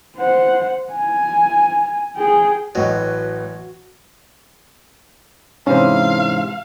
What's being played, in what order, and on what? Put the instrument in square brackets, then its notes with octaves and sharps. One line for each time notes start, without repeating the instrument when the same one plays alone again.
[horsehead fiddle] C5 F#5
G#5
G#4 G5
[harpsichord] A1 F#3 [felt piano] A2 D#5 [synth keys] F#4 [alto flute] B4
[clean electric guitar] G#2 C3 E3 [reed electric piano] C#4 C5 [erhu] F5